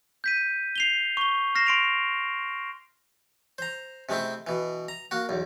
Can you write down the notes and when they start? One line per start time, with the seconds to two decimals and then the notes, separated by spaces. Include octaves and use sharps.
0.24 G6 B6 D#7
0.76 C7 F7 G7
1.17 C#6 G7
1.55 F6 A#6 C7 E7
1.67 C6 D7 F7
3.58 C5 A#5
4.09 C3 G#3 A3 C4 E4
4.47 B2 E3
4.88 A#5
5.11 A#3 F#4
5.29 B1 E2